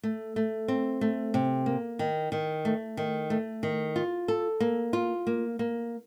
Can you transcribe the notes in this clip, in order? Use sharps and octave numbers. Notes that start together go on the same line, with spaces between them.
A3
A3
C4
A3
C3
A#3
D#3
D#3
A3
D#3
A3
D#3
F4
A4
A#3
F4
A#3
A#3